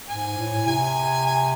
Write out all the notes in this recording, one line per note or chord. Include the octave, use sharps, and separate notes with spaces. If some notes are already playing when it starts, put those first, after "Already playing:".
G#2 G#5
A2
C3 G#5
G#5